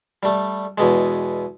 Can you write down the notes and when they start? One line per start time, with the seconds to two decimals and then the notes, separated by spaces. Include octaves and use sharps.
0.23 G3 A3
0.78 E2 B2 G#3